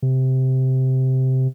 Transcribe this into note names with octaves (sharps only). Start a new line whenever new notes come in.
C3